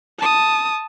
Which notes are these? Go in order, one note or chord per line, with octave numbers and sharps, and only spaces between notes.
A5 D#6